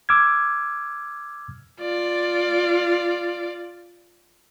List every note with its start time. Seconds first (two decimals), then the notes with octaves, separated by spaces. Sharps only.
0.09 D6 E6 F6 G#6
1.81 F4 D5